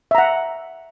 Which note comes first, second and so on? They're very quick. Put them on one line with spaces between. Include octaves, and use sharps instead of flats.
E5 A#5 F#5